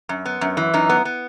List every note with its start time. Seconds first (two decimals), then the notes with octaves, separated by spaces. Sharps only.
0.09 F#2
0.25 B3
0.41 F#2
0.57 E3
0.74 F#2 D#4
0.89 B3
1.05 B3